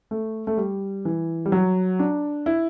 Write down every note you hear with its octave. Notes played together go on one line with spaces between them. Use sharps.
A3
A3
G3
E3
G3
F#3
D4
E4